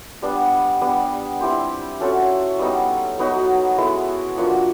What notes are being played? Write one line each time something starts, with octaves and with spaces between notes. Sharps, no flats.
G3 B3 D4
G3 B3 D4
C4 E4 G4 C5
C#4 F#4 A4 C5
G3 B3 D#4
F#3 B3 D#4 F#4
G#3 B3 E4 A4
F3 A#3 D4 F#4